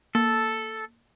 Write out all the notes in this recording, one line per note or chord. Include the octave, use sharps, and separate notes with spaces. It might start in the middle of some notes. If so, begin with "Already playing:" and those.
A#3 A4